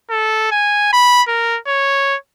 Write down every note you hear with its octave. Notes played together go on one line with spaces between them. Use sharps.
A4
G#5
B5
A#4
C#5